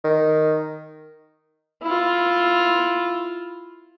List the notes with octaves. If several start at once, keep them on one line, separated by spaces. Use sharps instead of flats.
D#3
E4 F4